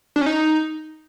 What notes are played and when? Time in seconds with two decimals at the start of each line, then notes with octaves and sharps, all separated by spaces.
0.16 D4
0.21 C#4
0.26 D#4